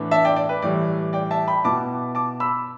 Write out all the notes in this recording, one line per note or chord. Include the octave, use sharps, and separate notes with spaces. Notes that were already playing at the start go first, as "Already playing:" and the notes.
Already playing: A2 E3 B3 D4
E5 A5
D5 G5
D5
B4
A2 E3 G3 D5
D5 G5
E5 A5
G5 B5
B2 B3 E4 A5 D6
A5 D6
B5 E6